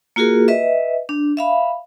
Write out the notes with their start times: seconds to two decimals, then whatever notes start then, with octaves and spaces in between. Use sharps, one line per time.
0.16 A#3 F4 F#4 G#4 A#4
0.48 B4 D#5 E5
1.09 D4
1.37 E5 F5 B5